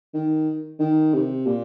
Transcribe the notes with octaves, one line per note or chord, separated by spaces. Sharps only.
D#3
D#3
C3
A#2